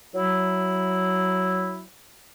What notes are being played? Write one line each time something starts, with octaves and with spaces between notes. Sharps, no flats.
F#3 E4